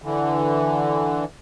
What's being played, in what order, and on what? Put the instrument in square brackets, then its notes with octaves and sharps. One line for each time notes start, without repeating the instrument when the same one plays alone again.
[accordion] D3 E3